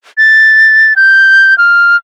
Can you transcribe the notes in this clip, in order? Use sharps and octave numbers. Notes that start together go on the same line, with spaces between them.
A6
G6
F6